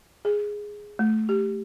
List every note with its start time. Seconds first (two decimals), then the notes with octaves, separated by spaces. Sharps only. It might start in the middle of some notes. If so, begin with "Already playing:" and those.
0.25 G#4
0.99 A3
1.29 G4